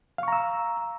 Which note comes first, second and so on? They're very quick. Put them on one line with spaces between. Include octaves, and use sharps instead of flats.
F5 C#6 A#5 E6